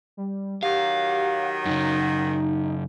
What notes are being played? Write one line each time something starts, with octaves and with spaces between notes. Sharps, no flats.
G3
D#3 F#3 G4 F5
F#2 C#3 D#4